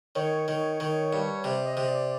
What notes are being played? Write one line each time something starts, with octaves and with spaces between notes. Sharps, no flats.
D#3 C#5
D#3
D#3
G2
C3 D5
D#5
C3
D5